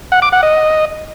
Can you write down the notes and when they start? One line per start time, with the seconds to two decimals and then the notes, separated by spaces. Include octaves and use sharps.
0.12 F#5
0.22 D6
0.32 F#5
0.43 D#5